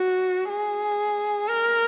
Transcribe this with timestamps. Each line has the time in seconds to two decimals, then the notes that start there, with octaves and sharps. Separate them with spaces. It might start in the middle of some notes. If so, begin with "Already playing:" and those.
Already playing: F#4
0.49 G#4
1.48 A#4